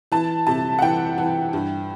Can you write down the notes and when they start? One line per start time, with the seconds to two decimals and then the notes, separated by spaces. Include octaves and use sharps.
0.12 E3 A5
0.47 C3 A5
0.79 F#5
0.82 E3 G5
1.18 E3
1.53 G2